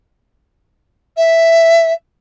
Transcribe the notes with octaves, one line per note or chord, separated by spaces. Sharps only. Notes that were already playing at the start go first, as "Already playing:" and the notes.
E5